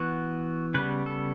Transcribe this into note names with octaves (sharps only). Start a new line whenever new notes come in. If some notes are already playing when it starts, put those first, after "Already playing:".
Already playing: E3 B3 F#4
C#3 G3 B3 B4
A4